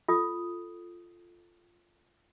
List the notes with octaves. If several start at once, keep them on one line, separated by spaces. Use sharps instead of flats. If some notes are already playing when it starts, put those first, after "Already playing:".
F4 A4 D#6